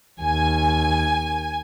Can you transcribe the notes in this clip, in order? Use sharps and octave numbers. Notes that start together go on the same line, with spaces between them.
D#2 G#5